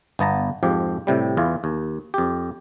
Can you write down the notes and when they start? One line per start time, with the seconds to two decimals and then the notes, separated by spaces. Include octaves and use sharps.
0.19 G1 B3 A5 A#5
0.63 F2 G#2 F3 G4
1.07 A2 C3 G3
1.37 E2 E3 F4
1.64 D#2
2.14 F2 G4